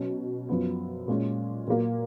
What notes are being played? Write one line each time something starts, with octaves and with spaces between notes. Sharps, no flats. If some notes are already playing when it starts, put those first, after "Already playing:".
Already playing: B2 F#3 C#4
F#2 F3 B3
A#2 G#3 C#4
A#2 F#3 A#3